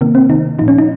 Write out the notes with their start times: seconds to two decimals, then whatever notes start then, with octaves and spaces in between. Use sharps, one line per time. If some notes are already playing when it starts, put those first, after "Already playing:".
0.01 C3 D#3 A#3
0.15 C4
0.29 C3 D#3 D#4
0.59 A#2 F3 D#4
0.68 C#4
0.78 D#4